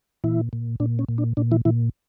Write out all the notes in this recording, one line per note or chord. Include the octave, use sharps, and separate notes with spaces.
A#2 E3 E4
A#2
A#2 D4
C#4
A#2
D4
A#2 D4
E3 E4
A#2 E3 E4